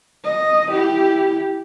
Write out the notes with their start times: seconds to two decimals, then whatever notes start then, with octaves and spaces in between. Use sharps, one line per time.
0.24 D#5
0.70 E4 G4